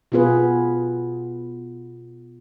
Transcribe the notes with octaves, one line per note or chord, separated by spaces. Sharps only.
B2 B3 F4 G#4 B4